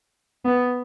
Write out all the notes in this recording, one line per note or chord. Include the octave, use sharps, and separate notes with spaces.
B3